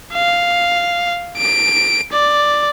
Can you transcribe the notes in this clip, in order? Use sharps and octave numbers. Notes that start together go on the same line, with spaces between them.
F5
D7
D5